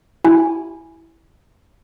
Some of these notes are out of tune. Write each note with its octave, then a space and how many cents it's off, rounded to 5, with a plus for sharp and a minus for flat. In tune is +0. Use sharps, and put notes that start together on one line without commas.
E4 +0 G4 -30 G#5 +0